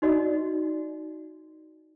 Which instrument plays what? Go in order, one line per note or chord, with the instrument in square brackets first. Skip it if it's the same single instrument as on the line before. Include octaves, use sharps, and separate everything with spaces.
[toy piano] D#4 F#4 D5 D#5